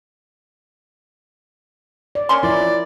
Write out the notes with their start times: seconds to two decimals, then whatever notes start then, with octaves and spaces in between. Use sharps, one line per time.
2.15 D5
2.29 A#3 C#4 C6
2.43 F3 E4 A#4 D5